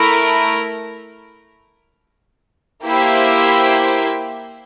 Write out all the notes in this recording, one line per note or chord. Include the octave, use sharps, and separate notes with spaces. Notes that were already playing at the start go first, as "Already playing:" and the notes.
Already playing: A3 E4 A#4
A#3 E4 G4 C5 E5